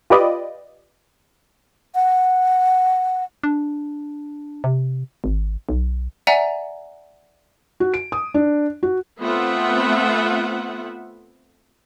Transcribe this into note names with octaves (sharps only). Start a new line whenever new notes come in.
F4 G4 B4 D5 D#5
F#5
D4
C3
G#1
B1
D5 E5 F#5 G#5 A#5
F#4
D7
D#6
D4
F#4
A3 B3 C4 F4 E5 F#5